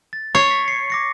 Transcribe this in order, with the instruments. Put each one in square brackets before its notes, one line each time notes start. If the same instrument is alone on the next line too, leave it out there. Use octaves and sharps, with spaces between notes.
[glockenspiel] A6
[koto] C#5 [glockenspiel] C#6 C7 C#7
[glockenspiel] B6
C7 C#7
D6 A#6 C#7